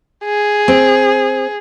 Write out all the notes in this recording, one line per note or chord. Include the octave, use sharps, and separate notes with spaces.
G#4
C4